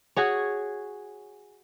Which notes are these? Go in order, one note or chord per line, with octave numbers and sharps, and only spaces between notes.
F#4 G#4 C#5